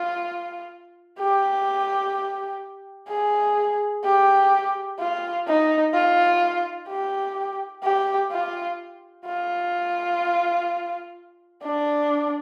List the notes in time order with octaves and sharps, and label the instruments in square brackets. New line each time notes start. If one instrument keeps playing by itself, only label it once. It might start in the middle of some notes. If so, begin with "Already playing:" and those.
Already playing: [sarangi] F4
G4
G#4
G4
F4
D#4
F4
G4
G4
F4
F4
D4